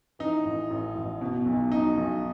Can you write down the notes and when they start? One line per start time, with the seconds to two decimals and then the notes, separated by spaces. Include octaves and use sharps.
0.19 E3 D#4
0.45 A1
0.70 A1
0.96 A1
1.21 B2
1.46 B1
1.71 F#3 D#4
1.97 B1